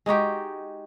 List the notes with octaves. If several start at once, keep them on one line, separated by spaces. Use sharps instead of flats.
G#3 D#4 F#4 G4